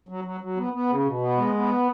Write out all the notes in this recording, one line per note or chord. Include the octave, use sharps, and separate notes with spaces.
F#3
F#3
F#3
B3
B3
C#3
B2
B3
G#3
B3